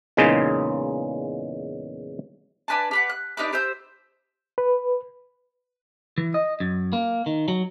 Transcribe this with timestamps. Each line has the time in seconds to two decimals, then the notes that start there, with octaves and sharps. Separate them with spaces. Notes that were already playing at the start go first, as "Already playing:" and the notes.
0.17 E2 A#2 C#3 G#3 D#4
2.68 D4 B4 G#5 A5
2.91 G4 B4 F#5
3.09 F#6
3.37 D4 D#4 G4 B4
3.52 G4 C5 E6 G6
4.58 B4
6.18 E3
6.34 D#5
6.60 F#2
6.93 A#3
7.26 D#3
7.48 F#3